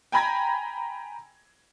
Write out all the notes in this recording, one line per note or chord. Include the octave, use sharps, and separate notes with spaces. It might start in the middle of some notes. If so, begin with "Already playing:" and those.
G5 G#5 A#5 B5 G#6 A#6